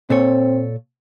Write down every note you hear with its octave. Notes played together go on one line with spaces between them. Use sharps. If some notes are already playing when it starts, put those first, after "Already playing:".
A#2 C4 A4 C#5